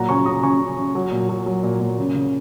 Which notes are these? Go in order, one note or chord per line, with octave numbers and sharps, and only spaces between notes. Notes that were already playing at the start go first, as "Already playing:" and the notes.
Already playing: A#2 F#3 F#5 A#5
C#3 G#5 C#6
C#3 A#5 D#6
C#3 G#5 C#6
C#3
C#3
F#3
A#2
F#3
F#3
A#2
A#2
C#3
C#3